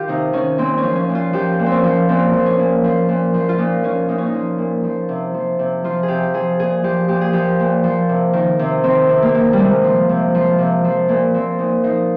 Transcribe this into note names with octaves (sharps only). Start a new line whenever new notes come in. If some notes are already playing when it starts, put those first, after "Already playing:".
Already playing: D#3 F4 G4
C3 D#4
D#3 C#4
A#2 C4
C#4
F3
C#4
A#2
F4
F3 G4
A#2
C4
C#4
F3
A#2 C4
F3
C#4
A#2
F3
A#2
F3
F4
A#2 D#4
F3 C#4
A#2 D#4
C#4
D#4
F3
A#2
F3
C3
F3
C3
F3 F4
G#4
C3 G4
F3 G#4
A#2 G#4
F3 G4
A#2 G4
G#4
F3 G4
A#2
F3
C3
D#3
C3
D#3 C4
C3
A#3
D#3
G3
C3 G#3
F3
C3
F3
C3
F3
A#2 A#3
F3 C4
A#2 D#4
F3 D#4